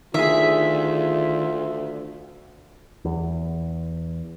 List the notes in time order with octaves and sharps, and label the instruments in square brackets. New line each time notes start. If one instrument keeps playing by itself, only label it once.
[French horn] D2 [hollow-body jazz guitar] D#3 G#4 [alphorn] F4 [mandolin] E5
[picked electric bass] E2